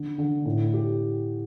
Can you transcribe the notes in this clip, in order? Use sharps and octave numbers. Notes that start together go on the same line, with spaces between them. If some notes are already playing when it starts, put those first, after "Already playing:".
Already playing: D3
D3
A2
G4